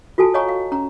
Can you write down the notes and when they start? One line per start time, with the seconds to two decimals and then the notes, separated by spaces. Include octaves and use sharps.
0.18 F4 F#4 A4 G#5 A5
0.34 C#5 D#5 F5 G#5 A#5 C#6
0.49 F5
0.72 C#4 A#5